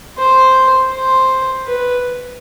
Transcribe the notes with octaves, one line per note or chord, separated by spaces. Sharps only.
C5
C5
B4